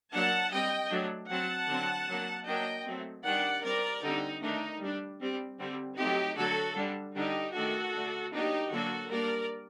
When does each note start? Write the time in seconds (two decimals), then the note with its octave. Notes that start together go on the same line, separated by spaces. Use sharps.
0.13 F#3 A#3 D4 F#5 A5
0.52 G3 C4 D#5 G5
0.91 F#3 A3 D4
1.30 F#3 C4 F#5 A5
1.69 D3 F#3 C4
2.09 F#3 A#3 D4
2.46 F#3 A#3 D4 D#5 G5
2.86 F#3 A3 C4
3.24 D#3 G3 D4 D5 F#5
3.63 G3 C4 A#4 D5
4.03 D3 G3 C4 D#4
4.42 D#3 A3 D4 D#4
4.81 G3 D4
5.21 G3 C4
5.59 D3 G3 C4
5.98 F#3 A3 C4 D#4 G4
6.37 D3 F#3 A3 F#4 A4
6.76 D3 G3 D4
7.15 D3 G3 D4 D#4 G4
7.54 D#3 A3 D4 F#4 A4
7.93 D3 A3 D4
8.32 F#3 A#3 D4 D#4 G4
8.71 D3 F#3 A#3 D4 F#4 A4
9.10 G3 A#3 D4 A#4 D5